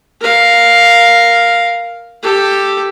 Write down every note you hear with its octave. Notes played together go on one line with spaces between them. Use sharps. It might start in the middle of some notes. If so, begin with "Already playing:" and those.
A#4 F5
G4 A4